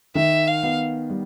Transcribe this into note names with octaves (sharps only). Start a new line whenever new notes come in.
D#3 E5
F5
B3
G3